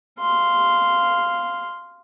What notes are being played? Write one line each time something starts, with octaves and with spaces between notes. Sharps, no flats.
F5 C6